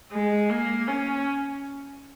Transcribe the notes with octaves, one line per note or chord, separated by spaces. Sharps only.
G#3
A#3
C#4